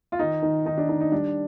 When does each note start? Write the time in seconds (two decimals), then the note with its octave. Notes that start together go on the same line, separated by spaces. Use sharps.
0.12 F4
0.19 D#3 D#4
0.42 D#3
0.65 D#3 D#4
0.78 D4
0.89 D#3 D#4
1.01 D#4
1.12 G3 D4